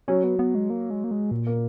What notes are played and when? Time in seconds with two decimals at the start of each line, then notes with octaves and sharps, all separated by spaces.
0.08 F#3 C#4
0.24 B3
0.39 B3
0.55 G#3
0.70 A#3
0.90 G#3
1.04 A#3
1.11 G#3
1.31 A#2
1.47 A#3